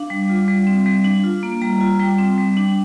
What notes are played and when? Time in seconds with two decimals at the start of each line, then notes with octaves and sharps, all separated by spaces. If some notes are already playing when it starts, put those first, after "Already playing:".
Already playing: D4 F5
0.10 G3
0.29 F4
0.48 G3
0.67 C4
0.86 G3
1.05 D4
1.24 F4
1.43 A#3
1.62 G3 A#5
1.81 F4
2.00 G3 G5
2.18 C4
2.38 G3
2.57 D4